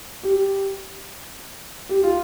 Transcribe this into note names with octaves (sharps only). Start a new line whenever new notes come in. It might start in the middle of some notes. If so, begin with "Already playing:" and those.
G4
G4
F4